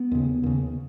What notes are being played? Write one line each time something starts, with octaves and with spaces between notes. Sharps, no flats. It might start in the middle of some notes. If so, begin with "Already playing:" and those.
Already playing: B3
D#2 C#3
D#2 C#3